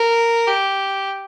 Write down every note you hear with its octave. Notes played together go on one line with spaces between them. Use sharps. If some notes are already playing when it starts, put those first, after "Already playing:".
Already playing: A#4
G4